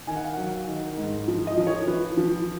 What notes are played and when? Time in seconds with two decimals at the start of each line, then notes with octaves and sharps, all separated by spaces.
0.07 D#3 G#5
0.16 F#5
0.24 F5
0.33 F#3 F#5
0.68 D#3
0.97 G#2
1.28 F3
1.47 D#5
1.57 F3
1.67 C#5
1.87 F3 B4
2.17 F3